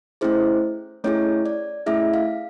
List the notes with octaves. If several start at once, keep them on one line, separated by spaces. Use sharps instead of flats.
A3 C#4 E4 G#4 C5
A3 C#4 E4 G#4 C#5
D5
A3 C#4 E4 G#4 E5
F5